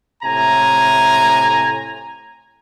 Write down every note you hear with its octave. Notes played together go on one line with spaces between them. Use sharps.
A2 C3 G#5 A#5